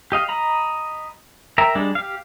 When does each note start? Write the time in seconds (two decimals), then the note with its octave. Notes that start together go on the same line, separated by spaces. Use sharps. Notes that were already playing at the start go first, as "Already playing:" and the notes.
0.12 G4 D#5 F5
0.28 D#5 A#5 B5
1.58 A#4 E5 G5 A#5
1.75 G3 G#3 D4
1.95 G4 F5